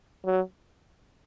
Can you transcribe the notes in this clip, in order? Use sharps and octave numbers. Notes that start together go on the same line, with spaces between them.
F#3